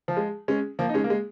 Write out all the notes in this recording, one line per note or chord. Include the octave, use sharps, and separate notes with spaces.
F3
G#3
G#3 C#4
F3 A#3
D#4
G#3 C#4
A#3
G#3